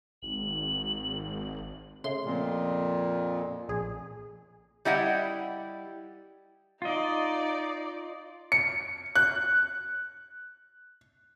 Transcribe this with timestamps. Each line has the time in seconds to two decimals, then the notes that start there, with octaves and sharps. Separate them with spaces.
0.22 G#1 F#7
2.04 C#3 A3 C6
2.25 F2 A#2
3.68 A#1 G#4
4.85 G3 E4 D#5 F#5
6.82 D#4 F4 D5 D#5
8.52 C#7
9.15 F#6